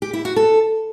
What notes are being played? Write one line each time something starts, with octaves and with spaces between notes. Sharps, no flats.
G4
E4
F#4
A4